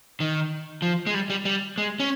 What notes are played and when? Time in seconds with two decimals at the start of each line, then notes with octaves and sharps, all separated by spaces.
0.20 D#3
0.82 F3
1.07 G#3
1.14 G3
1.30 G3
1.45 G3
1.78 G#3
2.00 C#4